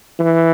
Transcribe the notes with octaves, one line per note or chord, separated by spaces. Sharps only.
E3